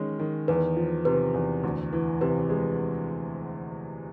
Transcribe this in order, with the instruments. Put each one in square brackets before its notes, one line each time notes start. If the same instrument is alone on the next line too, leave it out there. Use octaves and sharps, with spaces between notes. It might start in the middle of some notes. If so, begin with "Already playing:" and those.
Already playing: [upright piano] D#3 G#3 C#4
D#3
[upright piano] E2 [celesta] B4
[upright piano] F3
[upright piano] C3 [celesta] B4
[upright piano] E2
D2
E3
[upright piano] C3 [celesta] B4
[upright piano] G#3